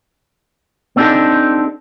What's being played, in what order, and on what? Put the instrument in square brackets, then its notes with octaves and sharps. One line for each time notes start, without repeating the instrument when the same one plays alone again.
[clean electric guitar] B3 C4 D4 D#4 G4 A4